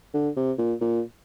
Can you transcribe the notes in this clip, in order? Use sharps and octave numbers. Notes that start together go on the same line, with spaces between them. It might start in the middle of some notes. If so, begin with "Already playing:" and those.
D3
C3
A#2
A#2